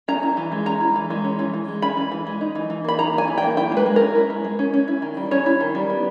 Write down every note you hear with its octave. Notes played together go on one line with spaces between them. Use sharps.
C#4 A#5
E4
E3
G#3
C#4 A#5
E4
E3
G#3
C#4
E3
E3
G#3
C#4 B5
E3
E3
G#3
D#4
E3
E3
A#3 B5
D#4 A#5
E3
G#5
E3
G5
A#3
E4 G5
G#3 B4
G#3
C#4 A#4
E4
G#3
G#3
C#4
C#4
E4
D#3
G3
C#4 C#5
E4
D#3
G3
B3